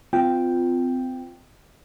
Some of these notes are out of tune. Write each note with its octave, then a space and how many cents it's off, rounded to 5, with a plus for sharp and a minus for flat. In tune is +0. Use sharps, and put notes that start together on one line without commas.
C4 -30 F4 +0 G5 +0